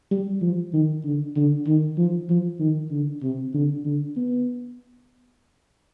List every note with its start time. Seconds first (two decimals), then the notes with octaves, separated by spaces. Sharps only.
0.11 G3
0.42 F3
0.74 D#3
1.05 D3
1.37 D3
1.67 D#3
1.98 F3
2.30 F3
2.60 D#3
2.92 D3
3.23 C3
3.54 D3
3.85 D3
4.17 B3